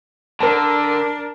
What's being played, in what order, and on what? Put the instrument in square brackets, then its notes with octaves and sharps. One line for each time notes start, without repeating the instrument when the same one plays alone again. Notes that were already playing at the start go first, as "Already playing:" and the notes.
[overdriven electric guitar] D3 [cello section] D4 [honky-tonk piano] A#4 A5